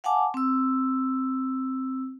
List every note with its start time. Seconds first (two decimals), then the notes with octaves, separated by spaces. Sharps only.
0.04 F5 F#5 G#5 A5 D6
0.34 C4 E6